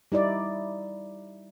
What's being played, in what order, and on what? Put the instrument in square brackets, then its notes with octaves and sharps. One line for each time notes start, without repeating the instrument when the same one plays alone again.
[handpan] G3 D#4 E4 D5